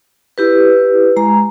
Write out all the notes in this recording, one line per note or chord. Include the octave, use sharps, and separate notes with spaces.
E4 G4 B4
G#3 A#5